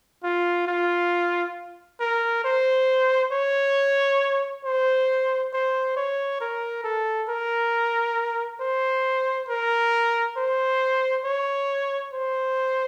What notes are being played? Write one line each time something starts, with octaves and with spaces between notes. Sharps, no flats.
F4
F4
A#4
C5
C#5
C5
C5
C#5
A#4
A4
A#4
C5
A#4
C5
C#5
C5